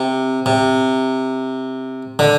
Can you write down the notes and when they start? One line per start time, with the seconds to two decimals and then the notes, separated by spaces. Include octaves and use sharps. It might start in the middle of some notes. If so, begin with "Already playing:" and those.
Already playing: C3
0.46 C3
2.19 D3